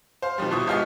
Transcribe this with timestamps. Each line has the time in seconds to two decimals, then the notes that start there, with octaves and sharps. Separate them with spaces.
0.22 C5 F5
0.38 B2 D#3 F3 G3
0.51 D#1 B2 E4 C#6 D#6
0.67 G#1 B3 F4 G4 D#5 F5